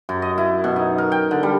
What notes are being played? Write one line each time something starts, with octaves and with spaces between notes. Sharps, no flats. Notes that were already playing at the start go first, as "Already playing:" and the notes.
F#2
D#5
E4
B2
D#4
A#4
G5
D3
G3